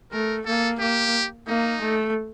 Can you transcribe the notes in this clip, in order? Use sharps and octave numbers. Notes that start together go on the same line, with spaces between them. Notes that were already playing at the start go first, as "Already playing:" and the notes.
A3 A#4
A#3 A4
A#3 G4
A#3 D#4
A3